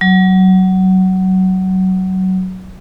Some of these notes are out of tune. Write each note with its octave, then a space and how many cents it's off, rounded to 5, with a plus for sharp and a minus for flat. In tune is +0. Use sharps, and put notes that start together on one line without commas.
F#3 +20